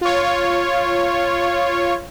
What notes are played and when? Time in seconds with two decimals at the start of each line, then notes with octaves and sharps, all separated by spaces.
0.01 F4 C#5